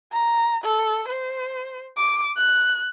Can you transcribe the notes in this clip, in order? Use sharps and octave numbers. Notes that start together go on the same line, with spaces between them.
A#5
A4
C5
D6
F#6